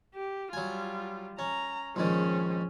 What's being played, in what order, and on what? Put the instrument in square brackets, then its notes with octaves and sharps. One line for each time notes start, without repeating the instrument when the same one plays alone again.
[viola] G4
[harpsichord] F#3 G#5 [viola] G3 F4
[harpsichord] C#4 [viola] A#5
[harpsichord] A#1 G#2 D#3 [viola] C#4 G#4